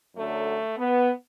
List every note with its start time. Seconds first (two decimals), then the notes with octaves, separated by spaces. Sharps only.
0.16 F#2 D3 F#3 A3
0.77 B3